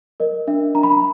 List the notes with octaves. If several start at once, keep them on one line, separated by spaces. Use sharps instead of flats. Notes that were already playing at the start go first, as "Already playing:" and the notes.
A#4 D#5
D4 E5
D4 A#5
B5
A#5